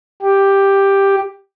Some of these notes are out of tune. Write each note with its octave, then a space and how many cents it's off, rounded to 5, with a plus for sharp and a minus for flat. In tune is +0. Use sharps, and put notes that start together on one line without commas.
G4 +5